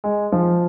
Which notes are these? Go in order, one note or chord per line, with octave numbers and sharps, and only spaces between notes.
G#3
F3